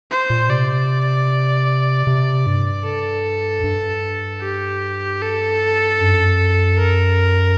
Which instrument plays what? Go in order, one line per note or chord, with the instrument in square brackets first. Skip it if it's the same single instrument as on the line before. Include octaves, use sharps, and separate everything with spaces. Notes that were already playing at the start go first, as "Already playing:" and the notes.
[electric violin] C5
[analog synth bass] A#2
[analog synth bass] C3 [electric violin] D5
[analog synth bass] C3
G2
[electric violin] A4
[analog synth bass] G2
[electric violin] G4
A4
[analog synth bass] F#2
[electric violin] A#4